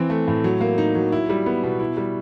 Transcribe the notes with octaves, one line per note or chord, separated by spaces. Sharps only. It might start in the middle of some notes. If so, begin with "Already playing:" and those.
Already playing: E3 C4
A3
A2
F#3
A#3
D#4
F#3
E4
G3
B3
B2
E4
G3